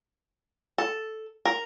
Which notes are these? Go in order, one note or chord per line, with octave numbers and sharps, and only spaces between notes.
A4
A#4